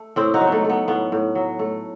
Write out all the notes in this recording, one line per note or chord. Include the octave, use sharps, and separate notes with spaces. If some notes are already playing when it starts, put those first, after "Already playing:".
Already playing: A3
A2 C4 E4
D#4 F#4
F#3
B3
A3
A3 B3
A2 B3
A2
F#3
A3